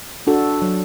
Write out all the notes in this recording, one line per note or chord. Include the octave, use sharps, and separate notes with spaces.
D4 F#4 A4
F#3